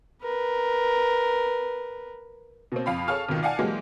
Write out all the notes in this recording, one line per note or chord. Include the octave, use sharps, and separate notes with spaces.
A#4 B4
B2 A#3 C4
F2 F5 B5
G#4 A4 C#5 F5 A5 F6
G#1 B2 D#3 F4
D5 F5 F#5 G#5 A5
E3 F#3 G#3 A#3 G4